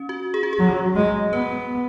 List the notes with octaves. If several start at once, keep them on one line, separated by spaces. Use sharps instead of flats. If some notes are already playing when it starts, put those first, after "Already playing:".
Already playing: C#4
F#4
G#4
F#4
G#4
F#3
G#3
B3 B4